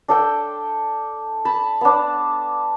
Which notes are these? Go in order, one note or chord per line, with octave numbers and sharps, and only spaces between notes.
D4 A4 G5
A5 B5
B3 D4